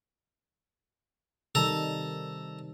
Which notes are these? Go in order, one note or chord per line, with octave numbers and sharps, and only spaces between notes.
C3 D#3 G3 A4 A#5